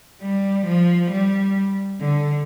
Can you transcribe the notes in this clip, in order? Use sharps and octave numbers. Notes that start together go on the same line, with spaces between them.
G3
F3
G3
D3